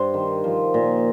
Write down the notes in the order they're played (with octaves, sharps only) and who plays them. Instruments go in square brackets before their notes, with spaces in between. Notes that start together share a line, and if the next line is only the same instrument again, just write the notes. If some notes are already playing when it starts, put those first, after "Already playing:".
Already playing: [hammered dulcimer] G2 C5
D#3
F3
A#2